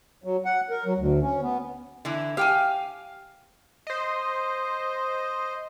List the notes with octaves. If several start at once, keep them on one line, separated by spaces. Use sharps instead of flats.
F#3
F#5
A#4
F#3
D2
C#4
B3
D3 E3 E4
G4 F5 G5 G#5
C5 D#5